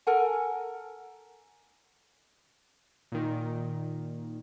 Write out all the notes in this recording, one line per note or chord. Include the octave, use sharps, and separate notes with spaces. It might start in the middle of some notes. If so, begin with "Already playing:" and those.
A4 A#4 F#5 G#5
A#2 D#3